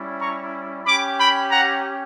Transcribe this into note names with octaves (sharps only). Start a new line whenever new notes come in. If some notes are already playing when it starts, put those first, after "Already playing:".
Already playing: G3 C#4 E4
A#5 C#6
C#4 G4 B5 D6
G5 B5
F#5 A#5